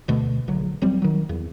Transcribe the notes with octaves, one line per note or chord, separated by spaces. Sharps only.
D2 B2 D3 A3
A#1 D3 F#3
D#1 F#3 G3 C4
D#3 F#3
E2